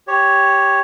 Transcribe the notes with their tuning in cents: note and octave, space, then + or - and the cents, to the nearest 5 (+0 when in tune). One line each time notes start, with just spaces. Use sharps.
G4 +0 C#5 +0